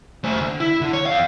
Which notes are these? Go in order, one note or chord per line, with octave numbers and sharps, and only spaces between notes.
A3 C5
D3
E4
D3
C#5
F2 F5